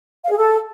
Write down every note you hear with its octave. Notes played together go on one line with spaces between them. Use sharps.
F5
G#4
A4